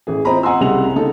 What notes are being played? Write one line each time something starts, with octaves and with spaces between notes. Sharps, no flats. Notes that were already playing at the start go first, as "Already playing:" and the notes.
A1 E3 G#4
C4 E4 F4 D#5 A#5 B5
D#5 F#5 G#5 A#5 C6 E6
C2 C#3 G3 F#5 F7
C#3 D#4 A4